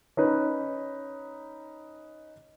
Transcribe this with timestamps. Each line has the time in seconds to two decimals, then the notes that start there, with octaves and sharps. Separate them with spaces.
0.17 C#4 D#4 B4